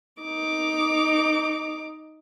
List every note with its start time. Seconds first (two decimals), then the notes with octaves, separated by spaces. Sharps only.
0.21 D#4 D6